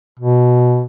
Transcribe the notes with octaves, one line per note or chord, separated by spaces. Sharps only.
B2